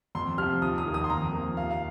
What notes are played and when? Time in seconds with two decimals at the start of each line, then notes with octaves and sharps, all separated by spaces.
0.15 F2 C6
0.38 C3 F3 F6
0.62 D#2 D#6
0.78 D#6
0.86 D#3 A#3
0.94 D#6
1.04 C6
1.10 F2 A#5
1.33 F3 A#3
1.57 D#2 F5
1.71 F5